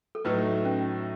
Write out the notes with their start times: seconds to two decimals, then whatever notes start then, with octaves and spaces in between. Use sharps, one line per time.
0.15 A4
0.24 A2 F#3 A3 D#4 B4
0.65 C#4